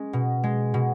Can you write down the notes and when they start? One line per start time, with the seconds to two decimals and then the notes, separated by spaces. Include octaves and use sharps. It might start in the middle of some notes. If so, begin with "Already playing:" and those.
Already playing: G#3 C#4
0.13 B2
0.43 G#3
0.74 B2